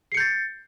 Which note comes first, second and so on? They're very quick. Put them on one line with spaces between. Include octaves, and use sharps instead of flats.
C7 C#7 G6 A6